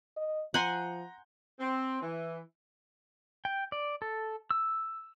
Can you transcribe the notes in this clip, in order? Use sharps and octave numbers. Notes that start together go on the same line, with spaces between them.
D#5
F3 F#5 G#5 A#5 C6 G6
C4
E3
G5
D5
A4
E6